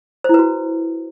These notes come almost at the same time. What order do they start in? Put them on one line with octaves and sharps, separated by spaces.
C5 E4 B4 F#4